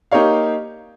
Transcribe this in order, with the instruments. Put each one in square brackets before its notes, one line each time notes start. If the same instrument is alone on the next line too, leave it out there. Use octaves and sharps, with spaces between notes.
[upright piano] A#3 D#4 G4 C#5 F5